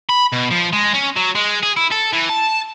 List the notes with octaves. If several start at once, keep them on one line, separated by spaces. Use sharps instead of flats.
B5
B2
F3
G#3
C#4
F#3
G#3
G#4
E4
A4
E3
A5